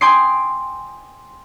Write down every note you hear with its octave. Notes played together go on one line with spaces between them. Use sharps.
G5 G#5 C6 D6 D#6 C7